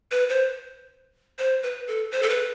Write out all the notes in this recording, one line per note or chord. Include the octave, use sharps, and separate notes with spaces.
B4
C5
C5
B4
A4
C5
A4
B4